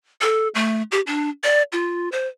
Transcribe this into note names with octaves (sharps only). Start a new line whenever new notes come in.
A4
A3
G4
D4
D5
F4
C5